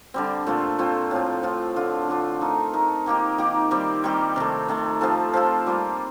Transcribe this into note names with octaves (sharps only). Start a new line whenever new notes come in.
D3 G3 C4
A#2 A3 C4 F4
A#2 A3 C4 F4
A2 F3 C4 F4
A2 F3 C4 F4
D3 A3 D4 F4
D3 A3 D4 F4
A3 D#4 A#4
A3 D#4 A#4
D#3 A#3 D#4 G4
D#3 A#3 D#4 G4
D#3 G3 C4 G4
D#3 G3 C4 G4
C3 D#3 A3
C3 D#3 A3
F3 C4 F4 A4
F3 C4 F4 A4
G3 A#3 F4 C5